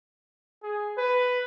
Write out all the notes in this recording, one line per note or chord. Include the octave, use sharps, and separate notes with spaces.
G#4
B4